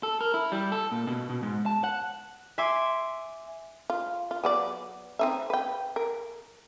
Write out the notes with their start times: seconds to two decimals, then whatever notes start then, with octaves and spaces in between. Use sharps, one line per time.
0.03 A4
0.21 A#4
0.34 E4
0.52 G3
0.72 A4
0.92 A#2
1.07 B2
1.30 B2
1.43 G#2
1.66 A5
1.84 F#5
2.58 E5 G#5 C6 D6
3.90 F4
4.31 F4
4.44 F#3 B3 D5
5.19 C4 D#4 E5
5.50 B4 G5
5.96 A#4